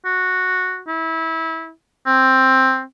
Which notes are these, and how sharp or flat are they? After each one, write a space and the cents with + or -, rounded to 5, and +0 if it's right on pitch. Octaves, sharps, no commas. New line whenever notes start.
F#4 -5
E4 -25
C4 +5